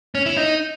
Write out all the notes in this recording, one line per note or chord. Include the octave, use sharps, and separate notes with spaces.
C#4
E4
D#4